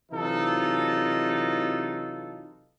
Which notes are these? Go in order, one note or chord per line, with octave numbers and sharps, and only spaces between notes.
C3 E3 F#3 D#4 F4 A4